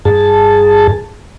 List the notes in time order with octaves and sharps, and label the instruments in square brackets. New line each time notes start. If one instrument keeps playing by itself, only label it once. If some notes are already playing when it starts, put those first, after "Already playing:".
[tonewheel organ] G2 G#4 A5